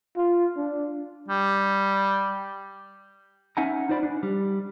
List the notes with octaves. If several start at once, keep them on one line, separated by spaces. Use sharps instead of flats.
F4
D4
G3
C#4 D#4 E5 F#5 G#5 A#5
D#4 F4 C5 D5 B5
D4
G3